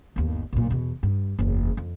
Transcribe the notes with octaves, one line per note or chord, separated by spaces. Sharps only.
G1 D#2
B1 A#2
E2 B2
G2
F#1 E2
F2